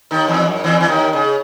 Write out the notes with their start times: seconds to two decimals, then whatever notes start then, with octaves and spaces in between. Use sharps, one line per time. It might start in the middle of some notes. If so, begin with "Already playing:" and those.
0.11 D#2 D#3
0.28 E2 E3
0.46 F#2
0.64 E2 E3
0.81 E3
0.88 D#2 D#3
1.13 C#3